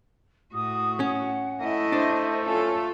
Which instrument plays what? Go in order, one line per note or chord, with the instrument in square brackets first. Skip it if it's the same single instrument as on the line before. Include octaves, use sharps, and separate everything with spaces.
[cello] A2 F#4 [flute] D#6
[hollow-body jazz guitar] C#4 [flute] F#5
[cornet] A3 [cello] E4 D#5
[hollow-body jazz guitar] D4 [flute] C5
[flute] C#4 [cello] F4 A4